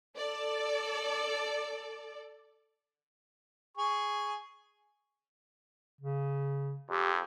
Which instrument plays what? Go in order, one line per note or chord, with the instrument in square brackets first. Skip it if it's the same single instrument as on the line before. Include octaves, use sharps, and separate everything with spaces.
[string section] A4 D5
[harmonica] G#4 C#6
[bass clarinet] C#3
[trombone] F2 [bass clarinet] G4